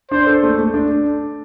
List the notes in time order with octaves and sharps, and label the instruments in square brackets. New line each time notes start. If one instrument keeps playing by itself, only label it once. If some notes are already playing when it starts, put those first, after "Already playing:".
[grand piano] D4 [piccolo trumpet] C5
[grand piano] A4
A3
A3
D4